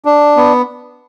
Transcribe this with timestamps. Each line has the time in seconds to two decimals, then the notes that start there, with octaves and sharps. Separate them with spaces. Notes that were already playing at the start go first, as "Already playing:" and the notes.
0.05 D4
0.36 B3